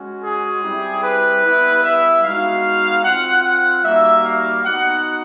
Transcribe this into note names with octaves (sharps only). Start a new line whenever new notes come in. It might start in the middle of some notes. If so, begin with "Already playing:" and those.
Already playing: G#3 C#4 F#4
G#4
G3 C4 E4 G4
B4
G3 B3 E4
E5
G#3 B3 D#4 F#4 F5
C4 F4 F#5
F#5
G3 A#3 D#4 F#4 E5
F5
B3 D#4 F#4 F#5